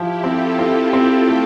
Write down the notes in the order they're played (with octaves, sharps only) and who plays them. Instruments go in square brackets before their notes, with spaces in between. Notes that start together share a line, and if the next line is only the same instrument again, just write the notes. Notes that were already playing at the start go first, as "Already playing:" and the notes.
Already playing: [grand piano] F3 [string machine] E4 G4
[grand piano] C4 [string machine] F4 A4
[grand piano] C4
C4
A3